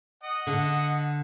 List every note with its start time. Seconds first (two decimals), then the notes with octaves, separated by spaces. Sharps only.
0.23 D#5 F#5
0.47 D3